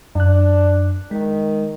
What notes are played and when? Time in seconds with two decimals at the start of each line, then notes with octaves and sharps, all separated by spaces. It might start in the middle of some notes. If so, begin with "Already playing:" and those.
0.15 F#2 D4 F#6
1.11 D#3 G#3